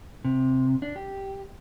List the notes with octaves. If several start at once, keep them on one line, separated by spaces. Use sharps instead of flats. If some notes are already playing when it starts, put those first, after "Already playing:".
C3
D4
G4